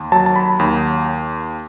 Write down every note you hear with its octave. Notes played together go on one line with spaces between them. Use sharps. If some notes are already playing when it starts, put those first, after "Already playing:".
Already playing: D#2
F#3 A5
A5
B5
D#2